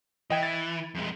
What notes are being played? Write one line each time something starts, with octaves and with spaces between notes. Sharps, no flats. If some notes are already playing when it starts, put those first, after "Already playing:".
E3 D#5 G5 G#6
A6
F2 G#3